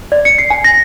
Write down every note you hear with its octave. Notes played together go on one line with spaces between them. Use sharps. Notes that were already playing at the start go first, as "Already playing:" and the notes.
D5
C#7
C7
G#5
A#6